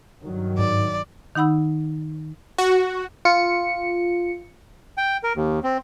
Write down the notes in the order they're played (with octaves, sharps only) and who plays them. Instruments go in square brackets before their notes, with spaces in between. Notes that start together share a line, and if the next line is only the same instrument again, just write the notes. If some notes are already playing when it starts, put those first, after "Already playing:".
[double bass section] G2 D#3 F#3
[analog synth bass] G#2 [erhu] D5
[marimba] D#3 D#4 F#5 B5 E6
[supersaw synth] F#4
[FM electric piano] F4 C#7
[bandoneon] G5
A#4
D#2
C4